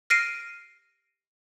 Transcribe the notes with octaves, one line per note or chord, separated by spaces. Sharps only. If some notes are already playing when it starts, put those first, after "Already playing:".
F6 A#6 C7 D7 D#7